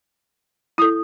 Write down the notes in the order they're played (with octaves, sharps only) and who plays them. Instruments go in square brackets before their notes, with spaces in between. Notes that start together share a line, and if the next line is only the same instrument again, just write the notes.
[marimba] E4 A4 [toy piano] D#6